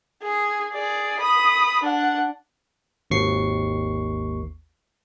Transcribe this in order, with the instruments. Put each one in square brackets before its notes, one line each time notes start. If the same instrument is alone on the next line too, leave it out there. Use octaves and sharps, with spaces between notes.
[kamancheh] G#4
G#4 D5
B5 D#6
D4 F#5
[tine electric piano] G#1 D#2 C#6 C7